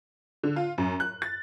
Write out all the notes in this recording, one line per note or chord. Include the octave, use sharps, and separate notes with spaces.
D3
F4
F#2
F#6
A6